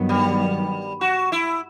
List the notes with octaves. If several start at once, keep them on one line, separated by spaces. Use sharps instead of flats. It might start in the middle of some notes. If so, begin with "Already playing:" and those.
Already playing: G2 D#3 F#3 B3
G3
F#4
E4